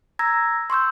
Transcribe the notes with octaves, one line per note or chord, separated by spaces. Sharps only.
A#5 E6 G#6 A#6
C6 C#6 E6 G6